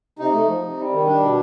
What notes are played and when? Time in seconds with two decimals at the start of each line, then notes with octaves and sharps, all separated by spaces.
0.19 C3 D#4
0.33 A3
0.48 F3
0.63 C3
0.77 G3
0.92 D#3
1.07 G3 D4
1.22 B2